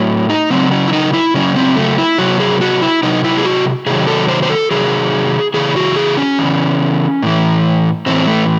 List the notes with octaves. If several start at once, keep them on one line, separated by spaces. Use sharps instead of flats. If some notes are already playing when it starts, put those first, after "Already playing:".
Already playing: A2 F#3
D#4
C#3 F#3 C4
C#4
E4
D#4
E4
C#3 F#3 C#4
C4
A3
E4
C3 F#3 F#4
G#4
F#4
E4
C3 F#3 D#4
E4
G#4
F#4
C3 D#3 F#3 G#4
A4
C5
C5
A4
C3 D#3 F#3 G#4
C#3 E3 G#4
F#4
G#4
C#4
C#3 E3
A2 E3
A2 E3 C4
A3